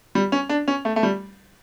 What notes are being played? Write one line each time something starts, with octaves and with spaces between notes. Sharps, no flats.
G3
C#4
D4
C#4
A3
A3
G3